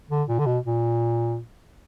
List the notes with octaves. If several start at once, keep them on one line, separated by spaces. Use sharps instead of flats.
D3
A#2
D3
B2
A#2